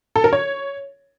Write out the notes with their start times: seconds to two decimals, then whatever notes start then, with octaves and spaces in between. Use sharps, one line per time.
0.16 A4
0.24 A#4
0.33 C#5